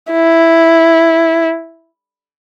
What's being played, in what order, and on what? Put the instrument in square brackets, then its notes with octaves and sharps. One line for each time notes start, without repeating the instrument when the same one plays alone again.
[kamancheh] E4